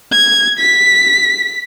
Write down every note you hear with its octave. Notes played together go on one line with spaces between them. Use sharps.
G#6
B6